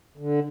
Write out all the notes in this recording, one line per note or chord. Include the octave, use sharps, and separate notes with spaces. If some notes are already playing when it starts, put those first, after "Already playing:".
D3